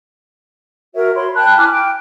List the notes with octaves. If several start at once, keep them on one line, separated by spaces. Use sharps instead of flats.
F#4 A#4 C#5 E5
F#4 C#5 B5 C6
G5 A5 B5 F#6
E4 G#5 D6 F6
G5